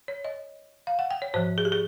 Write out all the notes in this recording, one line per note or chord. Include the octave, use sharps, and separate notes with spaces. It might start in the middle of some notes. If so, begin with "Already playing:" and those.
C#5
D#5
F5
F#5
G5
C#5
G#2 F3 C5
G#4
G4
G#4